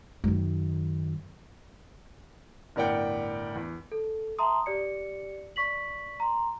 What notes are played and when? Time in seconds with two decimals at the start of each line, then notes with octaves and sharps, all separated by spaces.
0.24 F#2 D#3
2.76 G1 A2 A#4 D5 F#5 G5
3.55 E2
3.92 A4
4.39 E5 A5 A#5 C6 D#6
4.66 G4 D5 C#7
5.56 D5 C#6 B6 F#7
6.20 A#5 C6